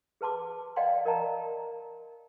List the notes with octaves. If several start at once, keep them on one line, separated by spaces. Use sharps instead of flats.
G#4 B4 A5 C6 D6
D5 D#5 F5 G5 G#5 C6
A#4 D5 D#5 G5 A5 A#5